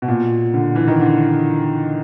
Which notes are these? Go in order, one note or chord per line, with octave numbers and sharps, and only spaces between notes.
B2
A#2
D3
E3
D#3
D3